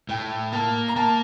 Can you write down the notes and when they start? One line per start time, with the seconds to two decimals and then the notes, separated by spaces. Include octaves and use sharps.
0.09 A2 G5
0.52 A#3 A5
0.88 A#5
0.96 A#3 A5